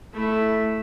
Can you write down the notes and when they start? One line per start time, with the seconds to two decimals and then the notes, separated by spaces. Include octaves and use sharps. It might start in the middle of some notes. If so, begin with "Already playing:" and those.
0.14 A3 E4